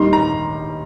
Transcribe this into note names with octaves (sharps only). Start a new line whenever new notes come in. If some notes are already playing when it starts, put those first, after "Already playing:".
Already playing: D#2 D#3 G3 D#4 C6
A#5